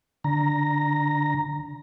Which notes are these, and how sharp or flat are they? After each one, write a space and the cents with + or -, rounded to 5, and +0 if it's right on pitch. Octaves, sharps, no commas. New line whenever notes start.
D3 +0 A#5 +0